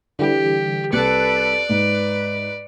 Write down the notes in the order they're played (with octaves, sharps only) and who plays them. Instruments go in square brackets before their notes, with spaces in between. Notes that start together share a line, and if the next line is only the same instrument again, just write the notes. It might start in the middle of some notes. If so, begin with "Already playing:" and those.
[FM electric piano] D3 E3 G3 [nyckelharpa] G4
[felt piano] C2 [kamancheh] A4 B4 [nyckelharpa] D5 D6 [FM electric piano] F#6 C#7
[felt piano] G#2 [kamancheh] B4